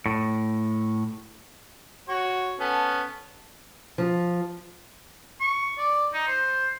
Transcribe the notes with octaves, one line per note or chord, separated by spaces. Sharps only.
A2
F#4 C#5
B3 C#4 A4
F3
C#6
D5
D#4
C5